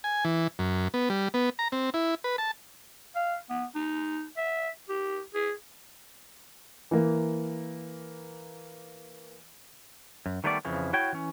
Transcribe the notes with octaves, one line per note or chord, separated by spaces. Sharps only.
G#5
E3
F#2
B3
G3
B3
A#5
C4
E4
B4
A5
F5
B3
D#4
E5
G4
G#4
E3 A#3
F#2
D#3 G3 A3 B3 G4 D5
F2 C#3 E3 F3
E4 F#4 C#5 G5
E3 C#4